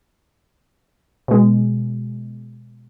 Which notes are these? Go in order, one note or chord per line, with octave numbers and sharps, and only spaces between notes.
B2 G#3